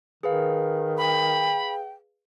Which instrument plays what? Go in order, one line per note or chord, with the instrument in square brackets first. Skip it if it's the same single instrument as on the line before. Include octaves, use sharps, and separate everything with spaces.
[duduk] D#3 [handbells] G#4 B4 F5
[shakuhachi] G5 [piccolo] B5